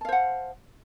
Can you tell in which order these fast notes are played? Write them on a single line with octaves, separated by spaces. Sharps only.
A5 F5 C5 F#5